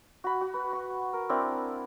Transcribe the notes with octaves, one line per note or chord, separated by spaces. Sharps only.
F#4 B5
F#4
B4
C#6
A#4
C4 D4 E4 A#4